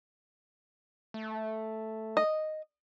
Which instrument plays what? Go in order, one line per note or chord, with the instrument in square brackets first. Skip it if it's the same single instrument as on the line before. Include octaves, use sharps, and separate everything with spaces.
[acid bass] A3
[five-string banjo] D#5